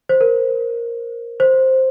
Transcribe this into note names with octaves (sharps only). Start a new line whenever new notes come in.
C5
A#4
C5